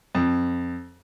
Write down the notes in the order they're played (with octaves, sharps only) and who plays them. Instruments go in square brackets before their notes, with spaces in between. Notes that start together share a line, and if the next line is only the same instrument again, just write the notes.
[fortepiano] F2